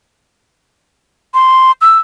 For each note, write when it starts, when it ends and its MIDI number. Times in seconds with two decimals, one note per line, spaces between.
1.34 1.72 84
1.81 1.98 88